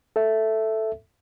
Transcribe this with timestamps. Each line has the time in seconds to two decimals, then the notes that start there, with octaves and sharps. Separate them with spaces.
0.16 A4 E5